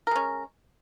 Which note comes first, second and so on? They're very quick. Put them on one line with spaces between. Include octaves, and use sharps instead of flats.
A#4 G#3 C#4